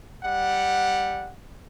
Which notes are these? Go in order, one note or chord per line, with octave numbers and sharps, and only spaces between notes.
G3 F#5